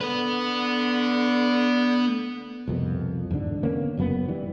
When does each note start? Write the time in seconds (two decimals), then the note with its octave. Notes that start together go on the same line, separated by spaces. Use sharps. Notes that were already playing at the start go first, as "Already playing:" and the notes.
0.01 D3 B3 B4
2.68 C2 F2 B2
3.31 E2 G#2 D3 D4
3.63 D3 A#3 B3 C#4
3.97 F#1 F#2 B2 B3
4.28 E3 G3